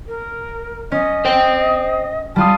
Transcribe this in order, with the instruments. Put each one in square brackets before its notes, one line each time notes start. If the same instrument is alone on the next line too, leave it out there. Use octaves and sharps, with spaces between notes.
[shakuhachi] A#4
[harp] C#4 [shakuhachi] D#5
[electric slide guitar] C5 G5
[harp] G3 F4 D#6 [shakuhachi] A5